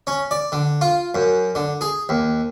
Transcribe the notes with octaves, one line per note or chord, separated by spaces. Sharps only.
C#4
D5
D3
F4
F#2
D3
G#4
D#2